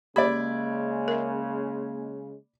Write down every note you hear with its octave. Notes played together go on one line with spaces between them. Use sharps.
C#3 G#3 A#3 G4 D5 B5 G#6
A#4 E5